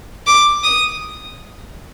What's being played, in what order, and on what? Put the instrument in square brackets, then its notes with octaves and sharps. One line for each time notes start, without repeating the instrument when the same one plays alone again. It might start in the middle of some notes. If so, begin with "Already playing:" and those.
[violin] D6
D#6